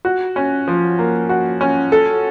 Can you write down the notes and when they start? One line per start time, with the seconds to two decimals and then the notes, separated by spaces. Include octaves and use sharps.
0.05 F#4
0.36 C#4
0.68 F3
0.98 A#3
1.29 F#4
1.61 C#4
1.92 A4